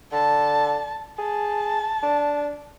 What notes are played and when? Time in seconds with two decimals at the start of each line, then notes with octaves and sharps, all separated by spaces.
0.12 D3 A5
1.19 G#4 A5
2.03 D4